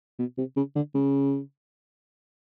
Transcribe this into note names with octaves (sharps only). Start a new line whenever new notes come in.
B2
C3
C#3
D3
C#3